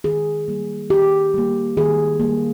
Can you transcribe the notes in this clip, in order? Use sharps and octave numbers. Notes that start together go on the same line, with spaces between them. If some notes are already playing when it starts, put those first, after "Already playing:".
D#3 G#4
G3 A#3
D#3 G4
G3 A#3
D#3 G#4
G3 A#3